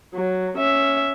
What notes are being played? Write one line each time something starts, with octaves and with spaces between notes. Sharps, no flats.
F#3
C#4 E5